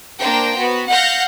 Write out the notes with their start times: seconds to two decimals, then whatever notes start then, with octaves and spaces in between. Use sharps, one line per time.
0.20 A#3 D4 C5 G5 A#5
0.57 B3 F#4
0.89 F5 F#5 F6 G6 A#6